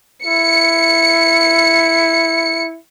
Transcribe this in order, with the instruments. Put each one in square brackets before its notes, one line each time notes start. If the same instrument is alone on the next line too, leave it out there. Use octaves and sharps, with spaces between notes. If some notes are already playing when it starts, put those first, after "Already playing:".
[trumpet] E4 [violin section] C#7